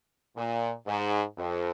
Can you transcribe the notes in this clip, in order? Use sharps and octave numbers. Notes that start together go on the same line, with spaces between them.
A#2
G#2
F2